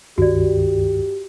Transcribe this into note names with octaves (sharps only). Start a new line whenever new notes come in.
C#2 G2 D#3 F#4 G4 D5